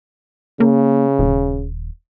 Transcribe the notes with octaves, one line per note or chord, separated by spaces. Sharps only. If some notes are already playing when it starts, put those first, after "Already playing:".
C#3 A#3
D#1